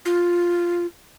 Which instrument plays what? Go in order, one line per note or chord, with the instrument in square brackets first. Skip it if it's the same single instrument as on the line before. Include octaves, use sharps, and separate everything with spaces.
[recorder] F4